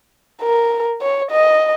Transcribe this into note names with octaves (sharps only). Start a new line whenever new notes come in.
A#4
C#5
D#5